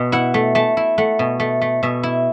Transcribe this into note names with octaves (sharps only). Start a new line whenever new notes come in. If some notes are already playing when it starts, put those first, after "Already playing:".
Already playing: B2
E4 F#5
A3
A3 A5
E4
A3 F#5
B2
A3
A3
B2 E5
E4